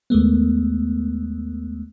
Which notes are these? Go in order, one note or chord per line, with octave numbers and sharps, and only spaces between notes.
D#2 G#3 A3 B3